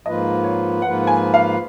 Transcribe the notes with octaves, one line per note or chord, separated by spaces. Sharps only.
G#2 F3 A#3 F4 B4 D#5
C#5
G#2 F3 A#3 F4 B4 F#5
G#5
F5